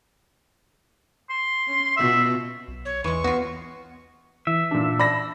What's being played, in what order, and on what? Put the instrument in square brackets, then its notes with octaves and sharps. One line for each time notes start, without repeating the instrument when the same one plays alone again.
[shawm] C6
[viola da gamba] C#4
[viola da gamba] B2 F4 F#4 [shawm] E5
[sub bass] B1
[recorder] C#5
[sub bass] E2 [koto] E3 G#3 [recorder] C#6
[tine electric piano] B3 [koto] F4 F#4
[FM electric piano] E3 [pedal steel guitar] E5
[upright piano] A#2 D4
[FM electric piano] D5 A5 E6 [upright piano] B5 A#6